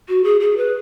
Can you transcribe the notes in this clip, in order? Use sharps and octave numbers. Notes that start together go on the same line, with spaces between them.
F#4
G#4
G#4
B4